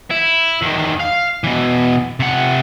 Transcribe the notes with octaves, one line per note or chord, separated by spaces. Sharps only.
E4
E2 D#3
F5
B2 E3
C3 F#5